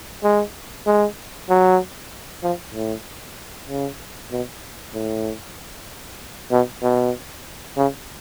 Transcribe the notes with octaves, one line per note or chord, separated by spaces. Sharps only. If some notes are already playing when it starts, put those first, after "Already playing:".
G#3
G#3
F#3
F3
A2
C#3
B2
A2
B2
B2
C#3